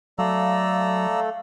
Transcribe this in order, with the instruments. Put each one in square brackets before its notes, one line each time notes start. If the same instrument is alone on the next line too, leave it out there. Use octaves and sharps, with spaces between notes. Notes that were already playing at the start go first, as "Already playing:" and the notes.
[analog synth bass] F#3 [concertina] A3 A4 [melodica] D5 A#5 E6 [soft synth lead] F5